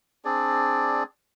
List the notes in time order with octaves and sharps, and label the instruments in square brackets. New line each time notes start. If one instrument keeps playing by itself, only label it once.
[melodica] C4 D4 G#4 D5